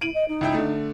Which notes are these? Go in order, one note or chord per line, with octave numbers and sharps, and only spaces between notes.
E4 D7 D#7 F#7
D#5
D#4
C#2 E4 G5
D3 A3